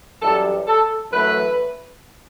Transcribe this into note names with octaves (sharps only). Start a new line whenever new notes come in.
F#2 E3 G3 A4
A4
F#2 E3 A3 B4